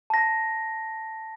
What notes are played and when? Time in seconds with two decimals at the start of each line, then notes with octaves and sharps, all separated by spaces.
0.10 A5 A#6